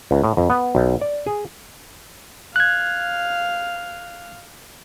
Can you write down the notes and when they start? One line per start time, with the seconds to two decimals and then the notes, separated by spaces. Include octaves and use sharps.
0.11 C#2
0.24 A2
0.37 F2
0.50 B3
0.75 B1
1.01 D5
1.27 G#4
2.56 F5 F#6 G#6